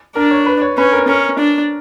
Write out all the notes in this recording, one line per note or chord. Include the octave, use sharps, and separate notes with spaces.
D4 A#4
C#5
B4
C#5
C#4 B4
A#4
C#4 A#4
D4